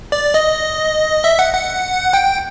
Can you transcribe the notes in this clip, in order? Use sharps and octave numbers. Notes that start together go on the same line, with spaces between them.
D5
D#5
E5
F#5
F#5
G5